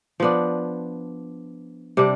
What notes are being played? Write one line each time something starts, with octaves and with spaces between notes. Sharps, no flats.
F3 B3 D4
C3 G3 D4